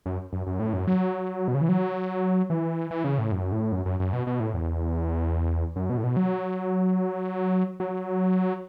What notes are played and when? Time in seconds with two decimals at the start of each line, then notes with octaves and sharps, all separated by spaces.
0.06 F#2
0.33 F#2
0.47 F#2
0.59 A2
0.73 F#2
0.87 F#3
1.48 B2
1.55 C#3
1.61 E3
1.69 F#3
2.50 E3
2.91 E3
3.04 C#3
3.18 A2
3.32 F#2
3.52 A2
3.72 F#2
3.86 F#2
4.00 F#2
4.13 B2
4.27 B2
4.40 A2
4.54 E2
5.76 F#2
5.90 B2
5.97 A2
6.04 B2
6.17 F#3
7.80 F#3